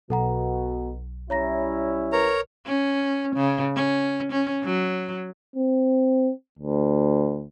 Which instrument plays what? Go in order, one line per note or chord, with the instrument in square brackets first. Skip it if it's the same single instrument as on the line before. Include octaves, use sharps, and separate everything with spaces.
[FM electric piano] B1 [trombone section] B2 [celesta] A4 F#5 A#5
[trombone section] G3 C#4 E4 [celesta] C#5 A#5 A#6
[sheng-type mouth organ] A#4 C#5 A#5 [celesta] B4
[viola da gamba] C#4
C#3
C#4
C#4
F#3
[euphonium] C4
D2